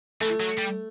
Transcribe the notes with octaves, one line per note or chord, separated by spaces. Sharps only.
E3 A3
F#3
G3